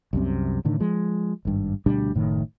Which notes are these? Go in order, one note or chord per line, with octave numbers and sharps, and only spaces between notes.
C2 F#2 C3
A2 D3 D#3
F3 G#3
G#1 G2
D2 B2 G3 D4
F#1 A2 D#3